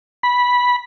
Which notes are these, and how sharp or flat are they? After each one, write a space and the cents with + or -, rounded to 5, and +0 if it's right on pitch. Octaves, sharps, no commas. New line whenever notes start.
B5 -10